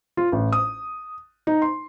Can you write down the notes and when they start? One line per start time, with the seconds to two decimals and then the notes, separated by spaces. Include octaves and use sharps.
0.17 F4
0.32 A1
0.53 D#6
1.47 D#4
1.62 C6